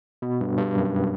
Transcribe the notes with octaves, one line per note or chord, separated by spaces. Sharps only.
B2
G2
G2
F#2